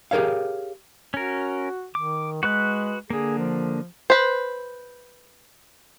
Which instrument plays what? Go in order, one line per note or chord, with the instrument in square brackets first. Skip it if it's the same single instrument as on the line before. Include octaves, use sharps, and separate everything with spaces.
[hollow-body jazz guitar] G4 G#4 A#4 C#5 F5
[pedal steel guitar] C#4 A#4 [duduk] F#4
[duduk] D#3 [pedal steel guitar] D6
[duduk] G#3 [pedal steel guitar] F#4 B4 F#6
[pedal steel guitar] D3 A#3 [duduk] G#4
[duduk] F3
[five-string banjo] B4 C5